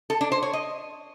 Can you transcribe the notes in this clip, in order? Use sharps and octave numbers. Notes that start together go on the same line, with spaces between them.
A4
D4
C5
C#5
D#5